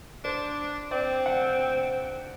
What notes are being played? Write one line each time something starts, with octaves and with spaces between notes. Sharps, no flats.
D4 C5
C4 D5
F#5
G5
G5